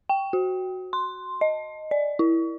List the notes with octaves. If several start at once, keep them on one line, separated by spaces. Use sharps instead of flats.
G5
F#4
C6
D#5
D5
E4